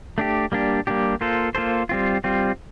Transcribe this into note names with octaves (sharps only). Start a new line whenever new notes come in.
A3 D4 G4
G3 A#3 D4 G4
G3 A#3 D4 G4
A#3 F4 A4 C5
A#3 F4 A4 C5
G3 C4 F4
G3 C4 F4